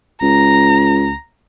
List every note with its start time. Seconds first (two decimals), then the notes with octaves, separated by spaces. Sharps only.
0.22 C#2 A#5